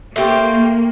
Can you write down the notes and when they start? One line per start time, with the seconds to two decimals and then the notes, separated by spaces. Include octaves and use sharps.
0.16 A3 A#3 G4 C5